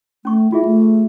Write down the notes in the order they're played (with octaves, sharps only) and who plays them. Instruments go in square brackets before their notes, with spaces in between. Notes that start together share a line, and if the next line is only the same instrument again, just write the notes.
[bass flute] A3 [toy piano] C#4 C#6
[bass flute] E4 [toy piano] F4 G#4 E5
[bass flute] A3